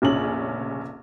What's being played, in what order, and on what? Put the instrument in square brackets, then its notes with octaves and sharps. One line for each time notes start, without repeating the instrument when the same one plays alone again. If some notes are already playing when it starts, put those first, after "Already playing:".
[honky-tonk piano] F1 A#1 C#3 C#4 F#7